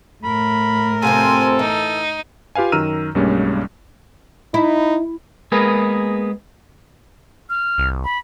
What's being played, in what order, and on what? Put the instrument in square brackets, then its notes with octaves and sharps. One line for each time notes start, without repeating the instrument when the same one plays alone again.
[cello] A2 A#4 [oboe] B5
[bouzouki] C3 F3 C4 [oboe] A4 [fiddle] G#5
[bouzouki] E3 [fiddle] D#4
[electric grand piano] F4 G4 B4 F5 G#5
F#2 D#3 A#5 E6 F6 D#7
B1 G2 G3 G#3 A#3 C#4
[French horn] D#4 [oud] E4
[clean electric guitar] G#3 A#3 B3 G#4 A#4 B4
[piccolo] F6
[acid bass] C2
[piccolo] B5